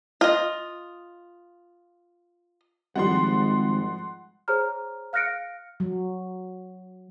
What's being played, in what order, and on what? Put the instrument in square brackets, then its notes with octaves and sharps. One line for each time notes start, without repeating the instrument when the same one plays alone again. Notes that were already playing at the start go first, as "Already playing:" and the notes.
[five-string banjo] F4 D#5
[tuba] G#1 [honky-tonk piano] F3 G3 G#3 [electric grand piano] F#5 C6
[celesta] G#4 C5 C#5 A#5 F6
F5 F6 F#6 A#6 C#7 D7
[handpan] F#3